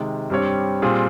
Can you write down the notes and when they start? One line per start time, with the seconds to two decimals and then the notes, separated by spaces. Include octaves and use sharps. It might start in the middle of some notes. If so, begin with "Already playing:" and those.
Already playing: C3 D#3 G#3
0.30 G2 G3 C4 G4 C#5
0.82 A#2 G3 C4 F4 G#4